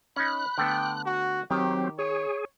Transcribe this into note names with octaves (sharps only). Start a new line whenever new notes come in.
C#4 D#4 B5 F#6
D3 A3 B3 G5
F#4
D#3 F#3 C4 G4
G#4 C#5